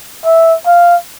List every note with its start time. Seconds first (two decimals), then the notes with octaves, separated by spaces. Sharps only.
0.25 E5
0.66 F5